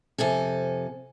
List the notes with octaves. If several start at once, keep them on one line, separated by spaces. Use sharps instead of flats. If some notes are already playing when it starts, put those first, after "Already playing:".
F2 C3 A4 G#5